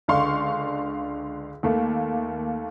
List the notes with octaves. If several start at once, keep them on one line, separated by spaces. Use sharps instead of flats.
C#2 D3 D4 F5 C6 C#6
D#2 A3 A#3